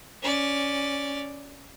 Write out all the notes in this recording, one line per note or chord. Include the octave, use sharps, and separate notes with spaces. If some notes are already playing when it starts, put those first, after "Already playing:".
C#4 D5